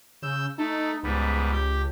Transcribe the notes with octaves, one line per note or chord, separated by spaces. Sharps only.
C#3 E6 G6
A3 D#4 A4
C#2 G#2 G3 B3
G4 G5